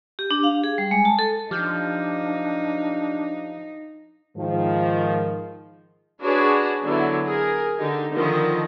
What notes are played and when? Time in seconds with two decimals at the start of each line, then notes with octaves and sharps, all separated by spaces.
0.19 G4
0.31 D4
0.43 F5
0.64 G#4
0.78 G3
0.91 G#3
1.05 A5
1.19 A4
1.51 F3 D4 D#4 G4 F6 G6
4.37 G#2 D#3 F3
6.22 D4 F#4 G#4 B4 C#5 D5
6.84 D3 F#3 B3 E4
7.27 G#4 A#4
7.78 D3 D#4 G4
8.15 D3 D#3 F3 D#5